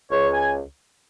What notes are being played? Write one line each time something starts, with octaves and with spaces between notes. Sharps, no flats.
C#2 C#5
G#5